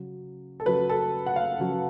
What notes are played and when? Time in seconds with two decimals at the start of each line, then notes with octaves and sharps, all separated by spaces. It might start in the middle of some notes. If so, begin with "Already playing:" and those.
Already playing: C#3 F#3
0.60 A4
0.66 C#3 F#3 B4
0.90 A4
1.26 F#5
1.36 F5
1.59 C#3 F#3